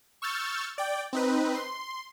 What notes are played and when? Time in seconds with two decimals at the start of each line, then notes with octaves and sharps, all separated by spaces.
0.22 C#6 E6 F6 G6 A6
0.78 D5 G5
1.13 C4 D#4 B4
1.55 C6